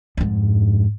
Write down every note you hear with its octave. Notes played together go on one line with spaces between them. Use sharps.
F2 G#2